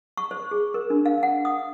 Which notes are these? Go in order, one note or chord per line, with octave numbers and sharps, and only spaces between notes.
C#6
C5
G#4
A#4
D4
F5
F#5
D#6